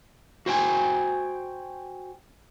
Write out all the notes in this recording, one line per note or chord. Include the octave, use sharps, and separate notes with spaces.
F#4 C5 G5 G#5